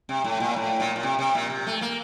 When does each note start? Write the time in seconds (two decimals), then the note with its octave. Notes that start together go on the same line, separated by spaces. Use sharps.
0.09 C3
0.24 A2
0.40 A#2
0.56 A2
0.80 A#2
0.96 A#2
1.03 C3
1.19 C3
1.35 A#2
1.50 C3
1.67 A3
1.81 A#3